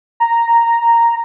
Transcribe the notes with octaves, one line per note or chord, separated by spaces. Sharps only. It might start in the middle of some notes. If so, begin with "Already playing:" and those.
A#5